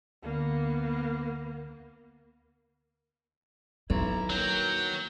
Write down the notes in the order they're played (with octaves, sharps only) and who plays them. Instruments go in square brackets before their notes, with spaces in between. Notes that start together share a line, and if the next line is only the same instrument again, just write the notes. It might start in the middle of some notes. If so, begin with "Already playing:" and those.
[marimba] D2 D3 [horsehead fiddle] A#3 B3
[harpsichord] B1 [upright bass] D#3 [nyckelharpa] E4 A#5
[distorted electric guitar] F#3 [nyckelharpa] A#3 G5